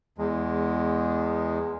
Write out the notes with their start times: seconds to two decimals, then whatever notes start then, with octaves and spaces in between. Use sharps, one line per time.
0.18 E2 G#3